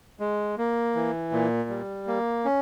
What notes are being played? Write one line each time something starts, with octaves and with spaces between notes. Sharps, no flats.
G#3
A#3
E3
A#2
G3
A#3
C#4